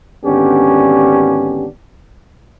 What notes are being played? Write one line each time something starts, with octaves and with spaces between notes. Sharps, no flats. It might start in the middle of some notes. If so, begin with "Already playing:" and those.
G#1 D3 B3 C#4 D4 G4